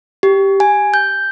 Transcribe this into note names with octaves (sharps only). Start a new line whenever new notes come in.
G4
G#5
G6